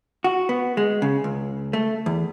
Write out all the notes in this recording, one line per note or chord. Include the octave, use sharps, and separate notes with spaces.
F#4
B3
G#3
C#3
C#2
A3
E2